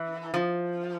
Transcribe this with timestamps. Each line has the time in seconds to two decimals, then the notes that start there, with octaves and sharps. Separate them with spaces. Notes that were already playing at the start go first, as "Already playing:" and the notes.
Already playing: E3
0.34 F3